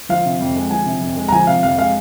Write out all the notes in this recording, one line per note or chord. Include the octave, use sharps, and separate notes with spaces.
F3 F5
C3
F2
G#3
F3 G#5
C3
F2
G#3
A#5
F3 G#5
C3 F5
F2 F5
G#3 F5